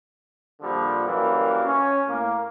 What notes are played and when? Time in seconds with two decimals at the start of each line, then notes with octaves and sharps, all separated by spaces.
0.62 A#1 D3 F3 G3
1.06 F#2 E3 G3 A#3
1.64 C#4
2.08 A2 A#3